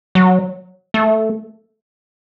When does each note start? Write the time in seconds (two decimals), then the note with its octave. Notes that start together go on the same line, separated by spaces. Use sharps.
0.15 F#3
0.94 A3